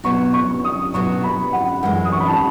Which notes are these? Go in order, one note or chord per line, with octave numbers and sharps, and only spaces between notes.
B2 F#3 B3 F#4 C#6
C#6
D#6
B2 F#3 B3 F#4 C#6
B5
F#5
F#2 E3 G#3 F#5
D#6
C#6
B5
A5